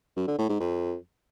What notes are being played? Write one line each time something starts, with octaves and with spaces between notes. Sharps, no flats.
F#2
D3
A2
G#2
F2